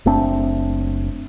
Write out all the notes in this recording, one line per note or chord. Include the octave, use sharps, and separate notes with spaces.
F#1 A3 C4 D4